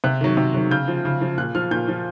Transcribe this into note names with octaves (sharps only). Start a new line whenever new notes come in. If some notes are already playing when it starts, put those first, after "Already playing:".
C3 F#6
D#3 F#3
C3
D#3 F#3
C#3 G6
F3
C#3
F3
A#2 F#6
F3 F6
A#2 G6
F3